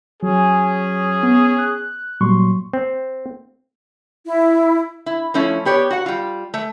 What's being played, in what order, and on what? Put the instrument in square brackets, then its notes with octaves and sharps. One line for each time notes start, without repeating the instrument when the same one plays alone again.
[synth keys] F#3 [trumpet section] C#4 G#4
[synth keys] B3
F#6
[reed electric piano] A#2 F#3 C#6 [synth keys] G3 C6
[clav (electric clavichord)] C4
[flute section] E4
[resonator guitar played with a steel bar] E4
F3 A3 C#4 E4
B3 G4 C#5 D5
F#4 F#5
G3 F4
A3